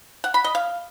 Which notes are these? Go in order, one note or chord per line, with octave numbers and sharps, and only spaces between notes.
F#5
B5
D#5
F5